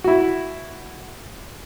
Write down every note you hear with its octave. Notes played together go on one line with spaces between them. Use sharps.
E4 F#4